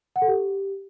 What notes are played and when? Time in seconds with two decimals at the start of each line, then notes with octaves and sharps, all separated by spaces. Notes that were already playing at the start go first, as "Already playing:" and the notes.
0.16 F#5
0.22 A4
0.28 G4